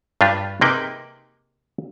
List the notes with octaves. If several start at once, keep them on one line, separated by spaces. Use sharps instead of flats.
G2 D4 F4 G4
C3 A#3 D#4 G#4 B4 G5